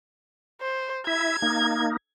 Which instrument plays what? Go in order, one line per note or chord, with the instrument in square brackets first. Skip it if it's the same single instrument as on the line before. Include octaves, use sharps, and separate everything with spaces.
[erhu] C5
[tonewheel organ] E4 E5 [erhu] G#6
[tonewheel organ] A#3 D#4